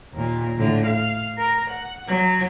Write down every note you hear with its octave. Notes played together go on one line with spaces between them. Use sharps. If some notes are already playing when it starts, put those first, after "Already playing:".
D#2 A#2
A2 D3
F5
A#4
F#5
F#3